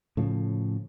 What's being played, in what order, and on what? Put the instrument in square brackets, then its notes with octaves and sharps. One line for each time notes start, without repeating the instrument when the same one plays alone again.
[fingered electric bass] A2 C#3 F3